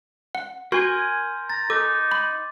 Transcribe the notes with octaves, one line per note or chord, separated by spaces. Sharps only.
F#5
F#4 A#4 G#5 C6 G6
A#5 A6
D#4 A4 D6
B5